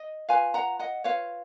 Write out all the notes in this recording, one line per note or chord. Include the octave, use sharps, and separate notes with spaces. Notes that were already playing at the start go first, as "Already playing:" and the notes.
Already playing: D#5
F4 B4 F5 G#5
F#5 A#5
D#5 F#5
F4 B4 C#5 F5